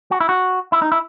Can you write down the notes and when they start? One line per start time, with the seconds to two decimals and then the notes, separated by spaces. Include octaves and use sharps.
0.11 F#4
0.20 E4
0.29 F#4
0.72 E4
0.82 D#4
0.92 E4